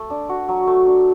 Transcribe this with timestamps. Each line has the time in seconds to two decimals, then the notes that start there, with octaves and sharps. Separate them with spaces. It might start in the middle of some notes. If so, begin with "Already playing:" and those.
Already playing: A3
0.10 D4
0.29 F#4
0.48 F#3
0.67 A3
0.87 D4